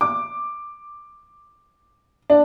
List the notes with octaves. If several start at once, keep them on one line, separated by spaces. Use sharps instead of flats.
D6
D4